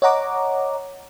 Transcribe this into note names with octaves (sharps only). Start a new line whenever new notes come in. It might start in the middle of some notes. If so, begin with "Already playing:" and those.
C#5 D#5 F#5 A#5 D6